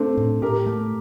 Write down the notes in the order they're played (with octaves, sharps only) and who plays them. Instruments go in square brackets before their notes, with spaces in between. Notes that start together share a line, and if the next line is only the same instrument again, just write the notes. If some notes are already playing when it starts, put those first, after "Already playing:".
Already playing: [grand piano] A3 C4 [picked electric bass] D4
[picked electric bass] A2
[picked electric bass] A2 [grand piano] G4 A#4
[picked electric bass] A3